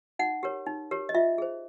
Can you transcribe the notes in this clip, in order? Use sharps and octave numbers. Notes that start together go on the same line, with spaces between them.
D#4 F#5
G4 A#4 C#5
D#4
G4 A#4 C#5
D#5
F4 E5
G#4 C5